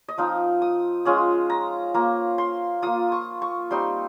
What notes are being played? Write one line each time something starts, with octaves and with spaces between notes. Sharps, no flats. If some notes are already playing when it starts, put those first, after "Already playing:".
D#5
F3 C4 D#4 F5
D#6
G#3 C#4 F4 D#6
A#5
A#3 F4 A#5
C6
A#3 F4 D#6
C#6
C#6
G3 C4 D#4 C6